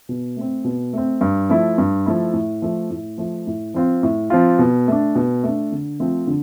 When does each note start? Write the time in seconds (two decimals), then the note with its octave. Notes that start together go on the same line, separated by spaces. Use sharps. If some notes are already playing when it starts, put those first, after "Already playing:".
0.09 B2
0.37 A3 C4
0.64 B2
0.93 A3 C4
1.21 G2
1.49 F3 A3 E4
1.78 G2
2.06 F3 A3 E4
2.33 A2
2.62 F3 A3
2.90 A2
3.18 F3 A3
3.47 A2
3.74 F3 C4 F4
4.03 A2
4.30 F3 C4 F4
4.59 B2
4.88 A3 D4
5.15 B2
5.43 A3 D4
5.72 D3
6.00 F3 A3 C4 F4
6.27 D3